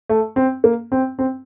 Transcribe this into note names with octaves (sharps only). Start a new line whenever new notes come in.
A3
C4
A#3
C4
C4